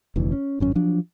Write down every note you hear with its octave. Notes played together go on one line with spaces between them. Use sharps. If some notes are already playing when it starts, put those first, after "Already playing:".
F1 D2 E3
C#4
G#1 F#2 C#4
F3 F#3 D4